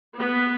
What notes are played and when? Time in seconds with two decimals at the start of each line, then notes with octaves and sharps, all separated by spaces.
0.18 B3